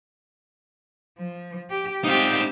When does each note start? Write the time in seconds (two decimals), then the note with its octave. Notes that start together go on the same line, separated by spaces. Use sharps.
1.19 F3
1.70 G4
2.04 G#3 C4 D#4 F4 G4 F5